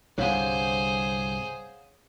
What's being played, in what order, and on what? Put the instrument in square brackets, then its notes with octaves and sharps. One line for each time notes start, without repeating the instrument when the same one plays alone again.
[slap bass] C2 G2 D3 [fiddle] G#4 C5 [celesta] C#5 F5 F#5